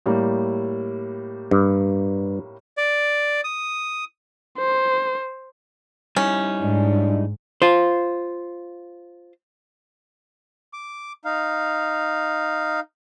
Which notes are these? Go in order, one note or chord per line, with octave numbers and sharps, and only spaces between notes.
A2 G3 A#3
G2
D5
D#6
C5
G3 C#4 D#4 E4
G#2 G#3 D4
F4 C5
D6
D#4 F5